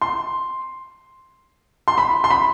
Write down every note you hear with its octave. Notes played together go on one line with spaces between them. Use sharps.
C6
C6
B5
C6
B5